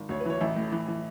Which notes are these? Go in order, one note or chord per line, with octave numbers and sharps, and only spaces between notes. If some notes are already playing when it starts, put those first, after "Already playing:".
Already playing: G#1
D2 C#5
B4
E3 C#5
A1 E5
A2
E3
E3